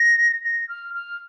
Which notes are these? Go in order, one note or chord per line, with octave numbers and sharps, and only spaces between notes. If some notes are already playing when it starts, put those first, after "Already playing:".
Already playing: A#6
A#6
F6
F6